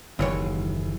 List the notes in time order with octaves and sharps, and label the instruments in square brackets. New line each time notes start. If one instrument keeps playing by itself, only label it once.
[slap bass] F#1 [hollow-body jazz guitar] D#2 E3 C#5